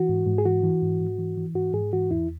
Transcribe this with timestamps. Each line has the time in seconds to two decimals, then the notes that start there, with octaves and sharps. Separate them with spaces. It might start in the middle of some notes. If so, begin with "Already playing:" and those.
Already playing: E3 F#4
0.09 G#2
0.26 G#2
0.38 G#4
0.45 E3 F#4
0.63 E3
0.82 G#2
1.01 G#2
1.18 E3
1.37 E3
1.55 G#2 F#4
1.73 G#2 G#4
1.92 E3 F#4
2.11 E2 E4